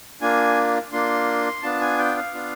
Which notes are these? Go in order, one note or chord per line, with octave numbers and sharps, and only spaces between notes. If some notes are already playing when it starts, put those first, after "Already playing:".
A#3 D4 F4 G#5
A#3 D4 F4 C6
B3 D4 F4 A5
G#5
G5
F5
B3 D4 F4